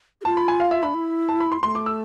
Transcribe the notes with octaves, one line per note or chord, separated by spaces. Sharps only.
G#4
F4 A5
B5
G#5
F5
E5
D4 B5
E4
A5
B5
C6
A3 C6
D6
E6